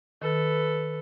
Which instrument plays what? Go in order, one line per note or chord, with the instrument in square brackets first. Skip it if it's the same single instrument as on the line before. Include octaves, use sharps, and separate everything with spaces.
[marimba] D#3 [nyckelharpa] A4 B4